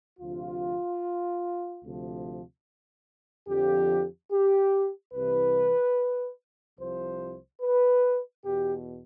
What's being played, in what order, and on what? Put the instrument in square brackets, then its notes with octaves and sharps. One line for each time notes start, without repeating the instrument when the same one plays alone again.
[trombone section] D2 C3 F3 F4
D2 C3 F3
F2 D3 F3 G4
G4
C2 C3 E3 B4
C2 C3 F3 C5
B4
E2 B2 G4